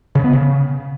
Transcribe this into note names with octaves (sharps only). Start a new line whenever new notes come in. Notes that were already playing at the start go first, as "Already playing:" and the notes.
C#3
B3
C#3